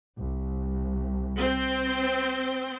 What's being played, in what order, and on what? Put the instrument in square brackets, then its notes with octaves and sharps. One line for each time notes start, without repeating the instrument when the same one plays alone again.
[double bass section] C2
[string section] C4 G6